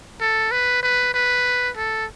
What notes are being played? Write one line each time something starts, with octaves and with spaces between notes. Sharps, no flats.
A4
B4
B4
B4
A4